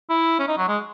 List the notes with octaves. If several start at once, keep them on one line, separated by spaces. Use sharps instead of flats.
E4
C#4
D#4
F#3
G#3